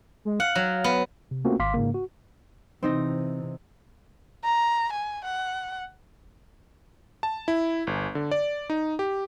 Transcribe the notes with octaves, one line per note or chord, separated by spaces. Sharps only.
G#3
F5 F#5
F#3
B3
C3
A3 A#3 C4 C#4 F4 F#4
G#1 F5 C6 D6 B6
G#2 C#3 A#3
F#4
C3 E3 C4 D#4 A#6
A#5
G#5
F#5
A5
E4
G1
D3
D5
D#4
G4